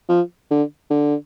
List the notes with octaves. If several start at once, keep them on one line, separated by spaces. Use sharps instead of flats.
F3
D3
D3